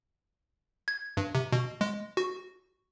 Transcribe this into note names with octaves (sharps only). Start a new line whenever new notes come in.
G#6
G2
C3
B2
G#3
F#4